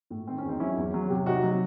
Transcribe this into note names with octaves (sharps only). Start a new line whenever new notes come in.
A2
D#3 C4
C#4
E2
C4 D#4
F#3 C#4 E4
E2
F#3
C3
C3 D#4 F#4
F#3